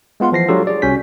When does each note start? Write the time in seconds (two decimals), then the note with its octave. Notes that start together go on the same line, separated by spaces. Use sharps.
0.20 G#3 B3 F4 F#5 C6
0.32 E3 F3 A#6 C7
0.48 F#3 G#3 D4 F4 G4 A4
0.67 G#4 D5
0.82 C2 C#4 F#4 G6 B6